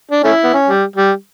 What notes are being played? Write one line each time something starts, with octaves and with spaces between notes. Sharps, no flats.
D4
A3 C#4 E4
B3
C#4
G3
G3